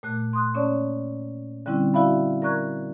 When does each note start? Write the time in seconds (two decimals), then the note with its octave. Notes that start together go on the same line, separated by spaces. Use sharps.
0.03 A#2 A3 F#6
0.33 C6 D#6 F#6
0.54 A#3 C#4 C#5 D5 A5
1.66 D3 G3 C4 C#4 E4
1.94 E4 F#4 D5 E5 F5 B5
2.42 A#4 D5 A#5 C#6 F#6 G#6